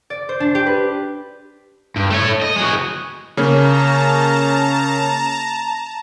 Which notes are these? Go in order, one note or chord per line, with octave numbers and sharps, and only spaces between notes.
D5
C5
D4
G4
B4
G2
A3 C#5
D#5
F#4 G#4
C#3 A#3 C#4 A5 A#5